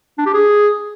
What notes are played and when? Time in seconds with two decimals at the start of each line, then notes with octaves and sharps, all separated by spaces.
0.18 D4
0.26 G4
0.34 G#4